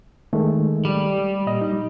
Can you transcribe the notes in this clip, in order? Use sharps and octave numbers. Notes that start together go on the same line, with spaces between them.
D#3 G#3 A3
G3
A#2 D#5
D#4